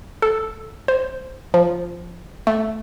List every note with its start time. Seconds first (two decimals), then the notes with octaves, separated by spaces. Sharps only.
0.22 A4
0.88 C5
1.54 F3
2.47 A3